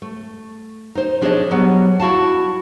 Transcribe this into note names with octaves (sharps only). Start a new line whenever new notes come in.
A3
D#4 C5
F3 D4 G#4 C5 C#5 D#5
F#3 G3 B3
E4 F#4 F5 A5